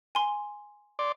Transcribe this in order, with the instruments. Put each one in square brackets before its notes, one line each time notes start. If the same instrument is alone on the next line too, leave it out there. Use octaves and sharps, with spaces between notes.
[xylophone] G#5 C6
[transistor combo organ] D5 C6 D6